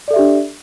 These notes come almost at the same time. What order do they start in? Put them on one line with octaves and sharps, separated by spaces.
D5 A4 E5 G4 D4